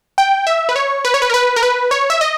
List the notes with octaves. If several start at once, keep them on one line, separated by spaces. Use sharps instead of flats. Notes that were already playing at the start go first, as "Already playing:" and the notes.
G5
E5
B4
C#5
B4
C#5
B4
A#4
B4
A#4
B4
C#5
E5
D#5